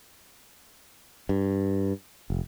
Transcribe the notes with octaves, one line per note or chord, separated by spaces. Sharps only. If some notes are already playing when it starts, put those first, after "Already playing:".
G2
F1